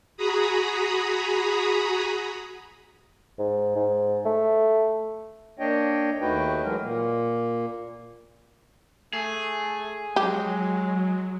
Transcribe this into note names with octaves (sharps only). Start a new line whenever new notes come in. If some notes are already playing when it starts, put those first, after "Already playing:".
F#4 G#4 A#5 B5 D#6
G#2
G#2
A3
A#3 D4 C#5 D#5 G5
D#2 A3 D#4 F#4 B4 G5
E3 F#3 G#3 A#4
A#2 A#3
A3 G#4
F#3 G#3 G4